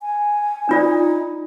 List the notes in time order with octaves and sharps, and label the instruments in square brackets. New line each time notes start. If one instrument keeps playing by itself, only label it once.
[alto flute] G#5
[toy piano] D4 F4 D5 [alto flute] D#4